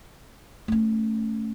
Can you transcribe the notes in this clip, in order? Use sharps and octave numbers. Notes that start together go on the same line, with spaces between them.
A3 C#4